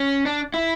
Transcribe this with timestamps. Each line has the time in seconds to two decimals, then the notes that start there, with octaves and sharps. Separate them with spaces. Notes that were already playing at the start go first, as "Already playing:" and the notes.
Already playing: C#4
0.26 D4
0.54 E4